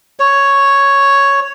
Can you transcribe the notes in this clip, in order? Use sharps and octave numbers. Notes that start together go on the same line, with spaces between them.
C#5